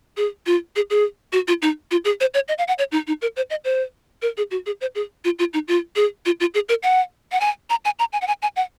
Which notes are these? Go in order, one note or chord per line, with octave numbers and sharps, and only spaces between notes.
G#4
F4
G#4
G#4
F#4
F4
D#4
F4
G#4
C5
C#5
D#5
F5
F#5
C#5
D#4
D#4
A#4
C5
D#5
C5
A#4
G#4
F#4
G#4
C5
G#4
F4
F4
D#4
F4
G#4
F4
F4
G#4
A#4
F#5
F#5
G#5
A#5
G#5
A#5
G#5
F#5
G#5
G#5
F#5